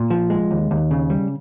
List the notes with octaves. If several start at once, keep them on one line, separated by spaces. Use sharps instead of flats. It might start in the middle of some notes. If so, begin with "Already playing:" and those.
Already playing: A#2
F3
G#3
D#2
D#2
C#3
G3